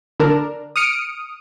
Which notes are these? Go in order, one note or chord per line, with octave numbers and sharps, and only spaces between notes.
D3 D4 A#4
D#6 F6 C#7 D7